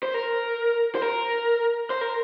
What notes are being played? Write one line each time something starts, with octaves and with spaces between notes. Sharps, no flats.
C5
A#4
C5
A#4
C5
A#4